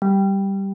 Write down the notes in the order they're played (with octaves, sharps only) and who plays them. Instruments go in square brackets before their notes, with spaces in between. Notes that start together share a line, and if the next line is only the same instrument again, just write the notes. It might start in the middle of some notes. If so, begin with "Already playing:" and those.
[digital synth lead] G3